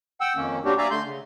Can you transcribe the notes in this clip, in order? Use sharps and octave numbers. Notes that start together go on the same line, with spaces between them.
F#5 G5 E6
F2 D#3 A#3 C#4
G3 A#3 C#4 D4 F#4 G4
D5 E5 F5 G#5 A#5
D3 A3 C6 G6
C#3